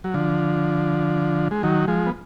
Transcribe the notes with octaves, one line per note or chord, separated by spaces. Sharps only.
F#3
D3 F3
G#3
D#3 F#3
F3 G#3
B3